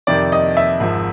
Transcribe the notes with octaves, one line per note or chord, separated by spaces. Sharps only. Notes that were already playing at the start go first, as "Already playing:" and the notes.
F2 C3 D#3 D5
D#5
E5
G#1 G#2 F3